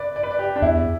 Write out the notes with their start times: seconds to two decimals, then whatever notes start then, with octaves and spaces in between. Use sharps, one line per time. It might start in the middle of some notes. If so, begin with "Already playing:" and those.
Already playing: B4 D5
0.16 D5
0.23 B4
0.31 D5
0.39 G4
0.56 D4
0.62 E2 E4